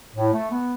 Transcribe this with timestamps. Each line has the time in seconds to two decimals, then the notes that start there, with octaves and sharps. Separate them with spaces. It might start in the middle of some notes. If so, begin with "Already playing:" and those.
0.16 A2
0.33 A3
0.50 B3